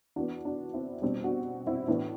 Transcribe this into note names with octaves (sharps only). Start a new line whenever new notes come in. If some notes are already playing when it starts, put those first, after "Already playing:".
E3 B3 D4 F#4
D4 F#4
C4 E4
B2 G3 C4 D4
D4 F#4
C4 E4
A2 E3 B3 D4